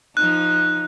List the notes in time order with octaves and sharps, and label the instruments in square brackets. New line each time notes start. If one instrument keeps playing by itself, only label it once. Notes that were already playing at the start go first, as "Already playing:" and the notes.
[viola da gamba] F3 D#4 [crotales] F#6